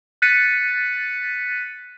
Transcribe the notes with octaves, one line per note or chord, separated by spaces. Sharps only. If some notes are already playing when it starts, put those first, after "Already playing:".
F#6 A6 B6 C#7 D#7